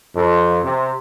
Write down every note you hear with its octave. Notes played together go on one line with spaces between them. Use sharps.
F2
C3